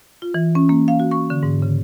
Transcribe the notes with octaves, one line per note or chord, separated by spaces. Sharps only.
F4
E3
C#4
A#3
F5
F#4
C#6
D3
G#2
C#3